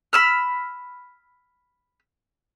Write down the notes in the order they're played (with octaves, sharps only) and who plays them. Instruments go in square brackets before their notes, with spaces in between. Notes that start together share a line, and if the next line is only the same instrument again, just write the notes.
[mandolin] B5 E6 F6